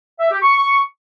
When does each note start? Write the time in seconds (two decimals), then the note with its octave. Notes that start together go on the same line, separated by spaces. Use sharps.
0.20 E5
0.31 G4
0.42 C#6